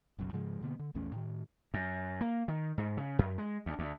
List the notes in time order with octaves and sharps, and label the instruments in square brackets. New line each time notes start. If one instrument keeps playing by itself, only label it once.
[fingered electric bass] F#1 B1 F#2
G#2 C#3 F3 G#3
B2 D3 A#3 B3
D3
A#1 E2 A3 C#4
A2 D#3
[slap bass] F#2
A#3
D#3
G#2
C#3
F#2
G#3
D2
D2